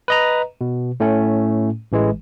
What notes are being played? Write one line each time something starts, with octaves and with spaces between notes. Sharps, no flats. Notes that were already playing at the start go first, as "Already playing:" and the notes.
B4 D#5 A#5
B2
A2 A3 C#4
A1 E3 G#3